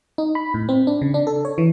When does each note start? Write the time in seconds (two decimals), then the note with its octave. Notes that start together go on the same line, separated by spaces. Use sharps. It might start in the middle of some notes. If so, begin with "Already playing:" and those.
0.18 D#4
0.35 B5
0.54 A2
0.69 C4
0.87 D4
1.02 C#3
1.14 D4
1.27 A4
1.45 C#5
1.58 E3